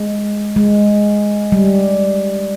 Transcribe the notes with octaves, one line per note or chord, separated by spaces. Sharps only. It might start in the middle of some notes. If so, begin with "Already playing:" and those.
Already playing: G#3
G#3
G3